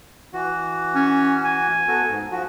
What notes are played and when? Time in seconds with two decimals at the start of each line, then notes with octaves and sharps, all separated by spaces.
0.33 E3 F#4
0.95 C#4
1.45 G#5
1.88 B3 F#4 A4
2.09 G#2
2.32 F3 F#4